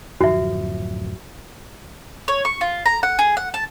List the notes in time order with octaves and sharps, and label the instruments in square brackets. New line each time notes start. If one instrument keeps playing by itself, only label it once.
[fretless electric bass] D1 F#2 F3 [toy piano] F#4 E5
[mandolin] C#5
C#6
F4
A#5
F#5
G#4
F#5
A5